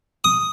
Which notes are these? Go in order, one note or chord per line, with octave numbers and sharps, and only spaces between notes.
D#6